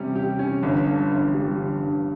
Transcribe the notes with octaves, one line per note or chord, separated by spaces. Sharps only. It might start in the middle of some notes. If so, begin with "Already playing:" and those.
Already playing: C3 G3 C#4
G4
C#4
G1
G2
G1
G3
G1
G2